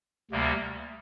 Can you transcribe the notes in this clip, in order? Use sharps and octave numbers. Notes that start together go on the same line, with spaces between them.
D2 C3 G3 A#3